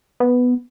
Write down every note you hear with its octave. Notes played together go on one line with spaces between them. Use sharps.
B3